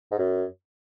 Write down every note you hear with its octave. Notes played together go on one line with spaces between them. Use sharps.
G#2
F#2